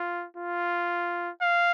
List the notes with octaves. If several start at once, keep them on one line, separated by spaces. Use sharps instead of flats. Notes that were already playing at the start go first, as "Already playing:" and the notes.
Already playing: F4
F4
F5